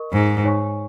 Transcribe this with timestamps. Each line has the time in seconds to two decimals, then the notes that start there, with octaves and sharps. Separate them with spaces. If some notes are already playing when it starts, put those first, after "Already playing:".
Already playing: A#4 D#5 C#6
0.13 G#2
0.44 D#4 C#5 G#5 C#6